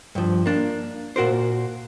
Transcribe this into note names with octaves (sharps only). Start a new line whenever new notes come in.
G2 F3
A#3 D4
A#2 F#4 A#4 C5